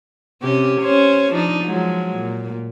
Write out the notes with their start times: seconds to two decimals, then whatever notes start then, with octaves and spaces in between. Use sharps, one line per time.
0.42 C3 C#4 G4
0.81 C#4 C5 C#5
1.33 F3 D4 D#4
1.64 F3 F#3 G#3
2.15 A#2